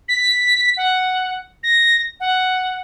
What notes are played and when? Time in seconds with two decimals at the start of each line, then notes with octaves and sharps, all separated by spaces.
0.08 B6
0.77 F#5
1.63 A#6
2.20 F#5